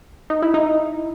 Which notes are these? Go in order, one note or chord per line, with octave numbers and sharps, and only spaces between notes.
D#4
E4
D#4